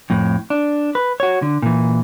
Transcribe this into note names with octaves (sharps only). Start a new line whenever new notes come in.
F2 A2
D4
B4
F#4 C#5
D3
A#2 E3